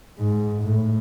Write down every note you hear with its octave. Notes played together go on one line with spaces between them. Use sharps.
G#2
A2